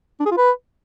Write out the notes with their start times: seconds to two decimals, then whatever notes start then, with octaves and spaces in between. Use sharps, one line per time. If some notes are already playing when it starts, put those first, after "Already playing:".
0.20 D4
0.26 G#4
0.32 F4
0.37 B4